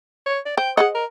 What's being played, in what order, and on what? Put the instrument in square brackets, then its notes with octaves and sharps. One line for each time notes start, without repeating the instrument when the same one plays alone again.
[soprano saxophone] C#5
D5
[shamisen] C5 [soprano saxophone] G5
[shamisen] G#4 C5 D#5 [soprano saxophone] F#5
[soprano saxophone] A#4